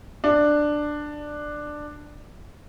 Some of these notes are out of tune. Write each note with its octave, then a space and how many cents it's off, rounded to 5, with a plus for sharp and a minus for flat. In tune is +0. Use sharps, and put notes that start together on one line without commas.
D4 +10